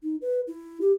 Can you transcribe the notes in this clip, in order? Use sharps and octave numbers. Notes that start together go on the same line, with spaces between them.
D#4
B4
E4
G4